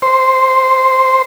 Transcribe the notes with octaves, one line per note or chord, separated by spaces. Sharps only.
C5